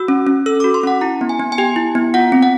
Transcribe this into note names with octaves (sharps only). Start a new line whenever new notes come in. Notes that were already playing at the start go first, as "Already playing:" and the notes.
Already playing: F#4 E6
C#4
C#4
A4 E6
F#4 D6
C6
C#4 F#5
E4 A#5
B3
G#5
B3
G#5
G4 G5
E4
B3
F4 F#5
C4
F#5